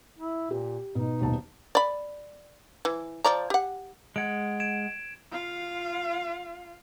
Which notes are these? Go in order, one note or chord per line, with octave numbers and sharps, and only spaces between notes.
E4
A#2 G4
B2 D#4
D#1 B1 A5
D5 B5
E3
F3 D5 A#5
G4 F#5
G#3 F#5 G#6 D7
G#6 D7 E7
F4 F5